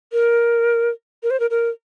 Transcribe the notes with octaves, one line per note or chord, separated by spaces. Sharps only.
A#4
A#4
C5
A#4
A#4